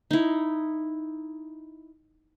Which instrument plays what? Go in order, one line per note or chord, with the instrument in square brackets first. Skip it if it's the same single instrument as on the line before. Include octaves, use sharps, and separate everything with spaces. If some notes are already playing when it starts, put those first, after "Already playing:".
[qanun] D#4 E4